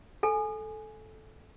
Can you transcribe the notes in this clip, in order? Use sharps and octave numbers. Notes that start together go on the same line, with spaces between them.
A4 G#5